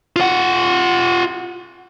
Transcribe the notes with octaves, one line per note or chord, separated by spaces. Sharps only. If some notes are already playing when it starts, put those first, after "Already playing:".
F4 F#5